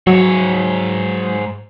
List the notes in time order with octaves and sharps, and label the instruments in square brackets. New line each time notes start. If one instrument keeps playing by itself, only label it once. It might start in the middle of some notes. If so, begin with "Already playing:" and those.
[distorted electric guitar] G#2 C#5 [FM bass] F#3